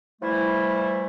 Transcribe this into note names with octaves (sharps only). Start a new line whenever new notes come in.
E3 F3 G3 A3 E4